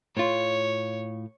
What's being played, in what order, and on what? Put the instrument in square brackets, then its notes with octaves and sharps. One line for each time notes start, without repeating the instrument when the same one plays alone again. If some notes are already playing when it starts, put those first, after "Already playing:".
[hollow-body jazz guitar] A2 F4 [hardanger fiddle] C#5